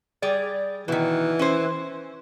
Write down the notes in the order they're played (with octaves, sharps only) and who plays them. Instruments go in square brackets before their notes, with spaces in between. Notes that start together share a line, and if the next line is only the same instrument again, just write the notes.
[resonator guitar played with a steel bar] G3 G#4 D5
[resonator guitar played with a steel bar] B2 D#3 [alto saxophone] E3
[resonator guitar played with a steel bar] C#4 C5